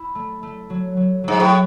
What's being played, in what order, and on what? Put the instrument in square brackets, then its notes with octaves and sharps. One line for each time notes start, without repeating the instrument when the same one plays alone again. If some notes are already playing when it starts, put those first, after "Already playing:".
Already playing: [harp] E4
A3
A3
F#3
F#3
[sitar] G#2 [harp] F#3
[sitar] A2